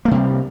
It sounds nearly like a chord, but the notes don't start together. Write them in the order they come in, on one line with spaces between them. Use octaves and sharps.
A#3 A3 C3 G3